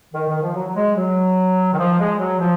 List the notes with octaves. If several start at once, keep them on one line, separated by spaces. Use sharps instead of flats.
D#3
D#3
F3
F#3
F#3
G#3
F#3
D#3
F3
G#3
F#3
F3